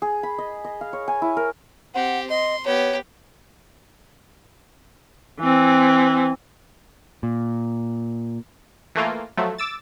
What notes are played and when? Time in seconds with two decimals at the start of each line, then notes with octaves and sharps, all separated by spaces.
0.02 G#4
0.23 B5
0.38 D#5
0.64 D#5
0.81 F5
0.93 C#5
1.08 G#5
1.22 E4
1.37 A#4
1.95 C4 G4 F#5
2.30 D#5 C6
2.66 B3 G4 C#5
5.39 E3 C4
7.23 A#2
8.95 E3 A3 A#3 F4
9.37 F3 F#3 A3
9.58 D6 E6 A6